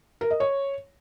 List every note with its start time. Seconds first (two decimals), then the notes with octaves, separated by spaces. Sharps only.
0.21 A#4
0.31 D#5
0.40 C#5